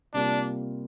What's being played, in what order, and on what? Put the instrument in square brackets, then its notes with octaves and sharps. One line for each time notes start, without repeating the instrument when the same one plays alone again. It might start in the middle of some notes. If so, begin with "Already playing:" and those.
[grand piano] C3 G3 A#3 F4 [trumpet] D4